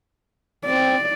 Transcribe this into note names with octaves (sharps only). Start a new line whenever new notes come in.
C4 D5